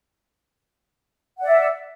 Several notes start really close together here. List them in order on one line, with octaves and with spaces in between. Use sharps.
F#5 D5 E5